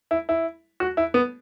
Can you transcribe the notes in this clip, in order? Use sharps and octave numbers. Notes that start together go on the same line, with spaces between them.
E4
E4
F#4
E4
B3